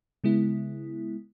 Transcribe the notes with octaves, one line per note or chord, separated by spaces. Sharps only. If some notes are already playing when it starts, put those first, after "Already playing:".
C#3 G#3 B3 E4